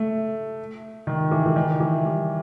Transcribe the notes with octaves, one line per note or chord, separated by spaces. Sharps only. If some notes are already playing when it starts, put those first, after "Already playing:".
Already playing: A3
D#3
E3
E3
D#3
E3
G3